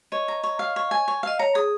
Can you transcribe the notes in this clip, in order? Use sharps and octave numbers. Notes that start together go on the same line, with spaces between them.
C#5 D#5
A#5
C#5
F5
C#5
G#5
C#5
D#5 F5
C#5 A#5
G#4 D#6